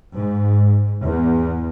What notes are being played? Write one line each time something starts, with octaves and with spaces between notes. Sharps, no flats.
G#2
E2